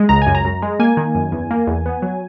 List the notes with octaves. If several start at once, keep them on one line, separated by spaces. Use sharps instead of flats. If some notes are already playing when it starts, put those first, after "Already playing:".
Already playing: G#3
C#2 A#5
F#2 G#5
A#5
F#2
G#3
A#3 G#5
D#3
F#2
E2
A#3
E2
B3
F#3